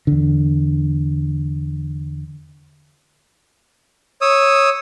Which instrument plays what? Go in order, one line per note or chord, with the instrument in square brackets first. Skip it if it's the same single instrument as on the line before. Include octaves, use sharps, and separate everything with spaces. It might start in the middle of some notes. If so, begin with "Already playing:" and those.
[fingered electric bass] E2 D3
[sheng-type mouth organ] C#5 D#6 E6